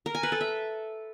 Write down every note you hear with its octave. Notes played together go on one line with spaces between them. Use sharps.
A#4
G#5
B4
A4
E5